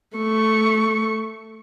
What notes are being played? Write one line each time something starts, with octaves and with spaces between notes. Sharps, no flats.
A3 C#6